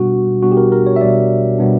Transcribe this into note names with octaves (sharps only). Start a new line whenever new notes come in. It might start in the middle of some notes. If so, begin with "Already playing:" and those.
Already playing: B2 G3 B3 D4 F#4
B2 G3 B3 D4 F#4
G4
A#4
A#4
C#5
E5
B2 G3 B3 D4 D5
B2 G3 B3 D4